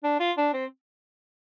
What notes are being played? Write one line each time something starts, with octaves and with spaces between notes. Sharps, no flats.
D4
F4
D4
C4